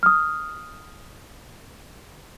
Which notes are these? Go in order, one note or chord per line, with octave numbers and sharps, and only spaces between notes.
D#6 F6